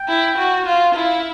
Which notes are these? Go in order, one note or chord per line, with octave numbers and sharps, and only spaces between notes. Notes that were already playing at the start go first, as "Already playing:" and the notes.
Already playing: G5
E4
F#4
F4 F5
E4 F5